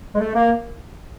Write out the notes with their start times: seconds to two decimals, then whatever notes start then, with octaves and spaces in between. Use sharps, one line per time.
0.15 G#3
0.20 A3
0.34 A#3